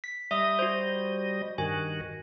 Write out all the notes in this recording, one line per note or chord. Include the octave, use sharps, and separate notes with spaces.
B6
G3 D#5 E5 D#6
F#4 C5
G2 D#3 F#4 G#5